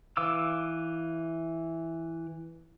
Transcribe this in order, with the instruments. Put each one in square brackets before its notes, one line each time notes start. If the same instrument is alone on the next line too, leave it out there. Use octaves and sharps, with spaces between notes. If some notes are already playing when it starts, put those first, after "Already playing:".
[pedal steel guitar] E3 F5 D6 E6